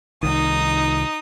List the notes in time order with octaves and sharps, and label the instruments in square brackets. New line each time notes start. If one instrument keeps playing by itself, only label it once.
[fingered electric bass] C2 D#3 [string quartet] D#4 D#6